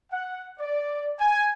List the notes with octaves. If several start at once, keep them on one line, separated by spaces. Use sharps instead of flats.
F#5
D5
G#5